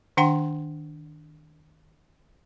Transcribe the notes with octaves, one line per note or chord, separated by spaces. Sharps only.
D#3 D4 F#5 G5 C6